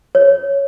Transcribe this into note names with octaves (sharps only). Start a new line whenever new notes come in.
C#5